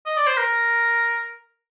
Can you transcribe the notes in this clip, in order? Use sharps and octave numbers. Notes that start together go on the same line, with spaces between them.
D#5
D5
C5
A#4